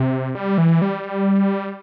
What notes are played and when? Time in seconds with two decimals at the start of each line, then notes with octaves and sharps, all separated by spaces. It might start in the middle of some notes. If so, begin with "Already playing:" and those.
Already playing: C3
0.35 G3
0.58 E3
0.82 G3